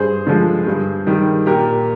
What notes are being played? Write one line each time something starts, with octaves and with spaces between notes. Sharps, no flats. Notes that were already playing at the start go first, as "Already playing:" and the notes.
Already playing: G2 G#4 C5
D3 F3 G#3
G2
D#3 G3
A#2 G4 A#4